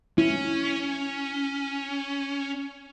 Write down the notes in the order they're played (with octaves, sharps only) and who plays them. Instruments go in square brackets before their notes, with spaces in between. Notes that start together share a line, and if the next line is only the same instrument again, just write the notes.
[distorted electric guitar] C#4 [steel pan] E4